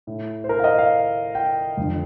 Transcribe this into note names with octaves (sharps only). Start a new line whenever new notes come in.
A2
C5
A#4
F5
D#5
F5
G5
F2 D3